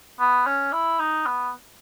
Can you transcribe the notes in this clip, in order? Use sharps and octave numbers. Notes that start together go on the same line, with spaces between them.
B3
C#4
E4
D#4
B3